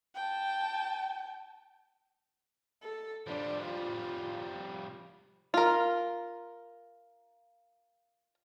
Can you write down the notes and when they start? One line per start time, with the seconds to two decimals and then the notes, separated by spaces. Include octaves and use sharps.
0.15 G5 A5
2.83 A4
3.27 F3 G3 D4
3.65 F4
5.54 F4 A#4